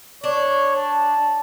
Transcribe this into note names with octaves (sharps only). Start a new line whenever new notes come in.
D4 C#5
A5